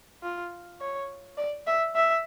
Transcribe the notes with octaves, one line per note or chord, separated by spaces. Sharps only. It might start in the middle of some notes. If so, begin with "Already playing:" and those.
F4
C#5
D5
E5
E5